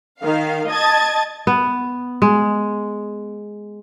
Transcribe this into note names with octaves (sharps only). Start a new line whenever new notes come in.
D#3 F5
D#5 A5 G#6 A6
B3
G#3